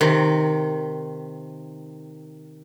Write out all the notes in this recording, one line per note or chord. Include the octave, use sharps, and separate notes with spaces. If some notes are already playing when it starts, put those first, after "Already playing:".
C3 D#3